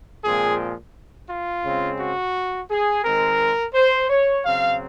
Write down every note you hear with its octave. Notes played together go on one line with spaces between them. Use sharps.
A#2 F3 G#3 C4 G#4
F4
C#3 G#3 C4
F#4
G#4
D#3 G#3 C4 A#4
C5
C#5
C#3 F#3 C4 F5